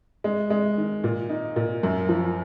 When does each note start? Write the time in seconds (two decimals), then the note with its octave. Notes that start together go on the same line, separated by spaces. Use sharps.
0.24 G#3
0.50 G#3
0.78 D#3
1.04 A#2
1.30 D#4
1.56 A#2
1.83 F#2
2.09 F3